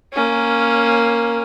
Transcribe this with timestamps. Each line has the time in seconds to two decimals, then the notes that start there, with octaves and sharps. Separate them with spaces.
0.13 A#3 C#4